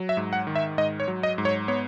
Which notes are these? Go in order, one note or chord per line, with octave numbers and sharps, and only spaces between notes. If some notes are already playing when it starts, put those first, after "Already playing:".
Already playing: F#3
E5
G#2
F#5
D#3
E5
G#2 D#5
C#5
F#3
D#5
G#2
C#5
B3 C#5